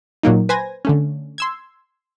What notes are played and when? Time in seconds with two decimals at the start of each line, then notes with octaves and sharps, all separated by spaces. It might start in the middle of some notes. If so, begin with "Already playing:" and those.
0.23 A#2 F#3 A#3 D#4
0.49 B4 C5 G#5 G#6 A#6
0.85 D3 A3 C#4
1.38 C6 E6 G#6